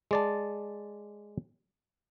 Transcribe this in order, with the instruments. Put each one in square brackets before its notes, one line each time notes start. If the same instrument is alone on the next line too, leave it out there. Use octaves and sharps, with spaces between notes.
[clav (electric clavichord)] G#3 D5 A5